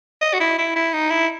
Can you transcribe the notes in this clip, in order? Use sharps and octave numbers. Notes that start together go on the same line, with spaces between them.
D#5
F#4
E4
E4
E4
D#4
E4